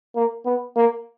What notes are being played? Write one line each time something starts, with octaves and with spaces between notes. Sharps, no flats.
A#3
B3
A#3